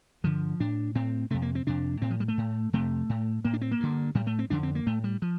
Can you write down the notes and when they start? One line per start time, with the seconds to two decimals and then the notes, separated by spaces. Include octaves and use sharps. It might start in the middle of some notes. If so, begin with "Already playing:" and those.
0.24 G2 D3 F3
0.60 A2 D4
0.95 A2 C4
1.30 F2 C3 A3
1.42 A#3
1.55 C4
1.66 F2 C3 D4
2.02 A2 C4
2.10 F3
2.20 G3
2.28 A3
2.38 A2
2.73 F2 C3 A3
3.09 A2
3.45 A2 A#3
3.53 D4
3.61 C4
3.71 A#3
3.80 G2 D3
4.15 A2 G3
4.27 A3
4.39 C4
4.50 F2 D3 D4
4.63 C4
4.75 A#3
4.86 A2 A3
5.04 G3
5.22 F3